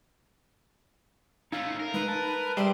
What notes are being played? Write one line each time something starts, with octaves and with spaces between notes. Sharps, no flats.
A3 C#4 D#4 F5
A#4
G#3 D#4 B4
A5
G3 G#4 C5 E5